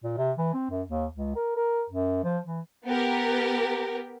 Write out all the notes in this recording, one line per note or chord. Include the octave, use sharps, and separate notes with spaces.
A#2
C3
E3
C4
F#2
D#2
C#2
A#4
A#4
F#2
F3
E3
B3 G4 A#4